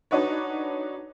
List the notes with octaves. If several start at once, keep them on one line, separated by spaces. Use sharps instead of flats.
D4 D#4 F#4 B4 C#5